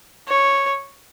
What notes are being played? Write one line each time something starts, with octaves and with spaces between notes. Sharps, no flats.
C#5